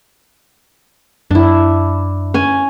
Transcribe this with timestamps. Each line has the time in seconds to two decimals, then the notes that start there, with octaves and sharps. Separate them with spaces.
1.31 F#2 D4 E4
2.34 C#4 G#5